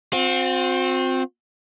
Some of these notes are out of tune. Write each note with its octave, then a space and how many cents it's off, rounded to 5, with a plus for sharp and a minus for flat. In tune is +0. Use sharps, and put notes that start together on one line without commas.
C4 +0 F#4 -45